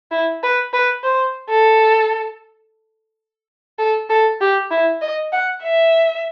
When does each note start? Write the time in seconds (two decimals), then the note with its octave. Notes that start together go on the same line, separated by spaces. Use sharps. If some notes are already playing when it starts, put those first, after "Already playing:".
0.11 E4
0.43 B4
0.73 B4
1.04 C5
1.49 A4
3.79 A4
4.10 A4
4.41 G4
4.71 E4
5.02 D#5
5.32 F#5
5.64 E5